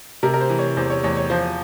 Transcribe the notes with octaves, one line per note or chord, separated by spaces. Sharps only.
C3 A#4
A#4
C5
E3
C#5
E2 C5
C#5
E2 C#5
C#5
F3 C5